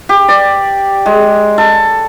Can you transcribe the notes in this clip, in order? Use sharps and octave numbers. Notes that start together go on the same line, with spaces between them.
G4
D5
G#3
A4